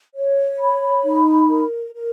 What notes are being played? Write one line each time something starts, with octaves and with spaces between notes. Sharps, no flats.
C#5
B5
D#4
A#4
A#4